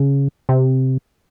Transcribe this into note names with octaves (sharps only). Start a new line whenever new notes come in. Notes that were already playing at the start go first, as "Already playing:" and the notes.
Already playing: C#3
C3